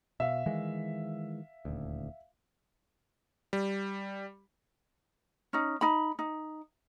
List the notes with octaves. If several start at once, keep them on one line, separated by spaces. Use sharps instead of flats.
B2 E5 F5
D#3 E3 G#3
D#1 D2
G3
C#4 D#4
D#4 B5
D#4